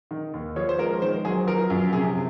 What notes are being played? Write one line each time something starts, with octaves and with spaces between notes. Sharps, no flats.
D#3
D#2
F3 C#5
C5
G#3 A#4
D#3 C5
F#3 G#4
F3 A#4
F#2
C3 G#4